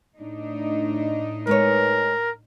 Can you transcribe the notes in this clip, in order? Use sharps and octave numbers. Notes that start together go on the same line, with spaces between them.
A2 D4 D#4
G#3 A#4 B4 C#5